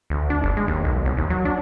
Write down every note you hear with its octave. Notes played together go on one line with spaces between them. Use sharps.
D2
D4
G1
G#3
D#2
B1
C2
D#2
F#3
D4